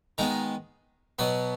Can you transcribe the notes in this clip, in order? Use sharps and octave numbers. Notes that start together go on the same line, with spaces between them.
D#3 G#3 B3 A#5
B2 F#3 B3 B5